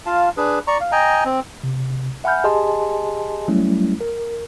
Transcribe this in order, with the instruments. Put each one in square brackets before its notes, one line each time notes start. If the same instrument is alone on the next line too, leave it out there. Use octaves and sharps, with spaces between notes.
[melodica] F4 F5 A5
D4 G#4 B4
D5 A#5 C#6
F5
D#5 G5 G#5 A#5
C4
[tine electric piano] C3
E5 F#5 G#5 B5 F6 G6
G4 G#4 D#5 G#5 A5 C6
F#3 G3 A3 C#4 E4
A#4